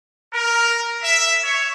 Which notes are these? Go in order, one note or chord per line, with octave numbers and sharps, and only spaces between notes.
A#4
E5
C#5